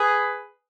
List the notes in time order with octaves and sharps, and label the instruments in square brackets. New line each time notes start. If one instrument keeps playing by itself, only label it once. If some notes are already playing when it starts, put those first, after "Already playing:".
Already playing: [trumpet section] G#4 B4